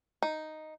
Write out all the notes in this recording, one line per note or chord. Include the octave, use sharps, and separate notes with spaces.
D#4